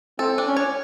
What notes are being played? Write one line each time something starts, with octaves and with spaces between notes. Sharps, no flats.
C4 A4
D4
C#4
C#5